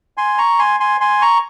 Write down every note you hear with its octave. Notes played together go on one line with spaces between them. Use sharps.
G#5 C6
A#5 C#6
G#5 C6
G#5 C6
G#5 C6
A#5 C#6